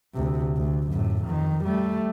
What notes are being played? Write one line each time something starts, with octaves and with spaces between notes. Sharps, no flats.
D2 C3
D2
F#2 A2
F2 D#3
G3 A3